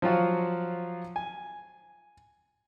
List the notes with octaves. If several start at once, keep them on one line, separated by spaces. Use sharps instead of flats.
F3 F#3 F4 F#4
G#5